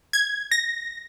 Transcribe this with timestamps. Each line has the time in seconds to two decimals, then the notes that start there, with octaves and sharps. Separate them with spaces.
0.13 G#6
0.51 A#6